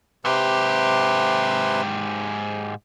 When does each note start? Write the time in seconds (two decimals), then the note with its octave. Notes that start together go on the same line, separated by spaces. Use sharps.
0.25 G#2 C3 G4 B4 C6